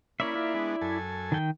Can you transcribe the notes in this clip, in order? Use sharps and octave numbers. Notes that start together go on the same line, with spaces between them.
A#3 C#4 E4 D5 E5 B5
A#3 F4
G#3 B3 D4
F#2 A4 G#5
D#3 G5